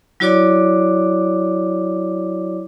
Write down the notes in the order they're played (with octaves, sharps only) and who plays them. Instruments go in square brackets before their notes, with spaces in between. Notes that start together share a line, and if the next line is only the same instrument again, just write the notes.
[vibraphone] F#3 E4 F#4 C#5 D5 D6